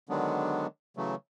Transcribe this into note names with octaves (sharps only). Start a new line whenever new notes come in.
D3 D#3 F#3 G#3 B3 D4
C#3 E3 F#3 A3